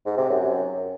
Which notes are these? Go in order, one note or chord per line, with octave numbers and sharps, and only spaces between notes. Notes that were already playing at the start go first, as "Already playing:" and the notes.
G#2
C3
F#2